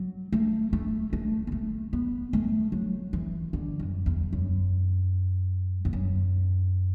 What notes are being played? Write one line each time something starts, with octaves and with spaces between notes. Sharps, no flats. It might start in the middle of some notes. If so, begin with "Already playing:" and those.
Already playing: F#3
A3
A3
A3
B3
A3
B3
A3
F#3
E3
D3
F#2
E2
F#2
E2
F#2